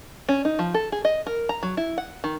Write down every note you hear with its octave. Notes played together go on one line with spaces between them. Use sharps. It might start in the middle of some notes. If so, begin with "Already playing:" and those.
C#4
D#4
F3
A4
G#4
D#5
A#4
A#5
F#3
E4
F#5
D#3